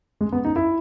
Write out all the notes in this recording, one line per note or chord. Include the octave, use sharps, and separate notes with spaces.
G#3
B3
D#4
E4